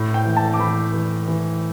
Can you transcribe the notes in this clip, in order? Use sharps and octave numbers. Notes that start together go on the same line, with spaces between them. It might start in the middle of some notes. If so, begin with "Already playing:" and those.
Already playing: A2
G5
E3
A5
D6
E3 B5
E3
E3